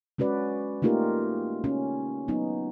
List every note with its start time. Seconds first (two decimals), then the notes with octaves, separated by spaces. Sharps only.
0.18 G#3 C#4 F#4 B4 D5
0.82 A3 A#3 D#4 F4 G4 A#4
1.64 C#4
2.28 F#3 B3 D#4